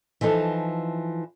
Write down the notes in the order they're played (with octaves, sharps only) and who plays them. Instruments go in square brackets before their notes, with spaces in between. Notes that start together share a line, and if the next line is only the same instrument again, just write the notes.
[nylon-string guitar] E3 F3 D#4 A4